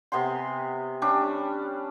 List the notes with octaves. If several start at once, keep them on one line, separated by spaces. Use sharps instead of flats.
C3 B3 G#5 C6
G3 C#4 D4